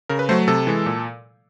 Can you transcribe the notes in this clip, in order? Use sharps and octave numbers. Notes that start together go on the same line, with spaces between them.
C#3 A#4
B4
F#3 A3 C5
C3 A4
E3 G#3
A#2